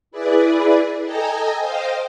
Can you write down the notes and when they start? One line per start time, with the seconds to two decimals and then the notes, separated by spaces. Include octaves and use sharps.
0.11 E4 G#4 B4 D5
1.03 A4 D#5 G5 G#5 A#5
1.59 C5 D#5 F5 G5